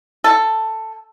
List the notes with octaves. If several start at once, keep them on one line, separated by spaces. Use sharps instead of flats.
A4